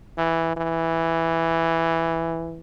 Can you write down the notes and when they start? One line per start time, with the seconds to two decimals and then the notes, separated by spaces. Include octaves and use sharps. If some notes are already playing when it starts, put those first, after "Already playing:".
0.18 E3
0.56 E3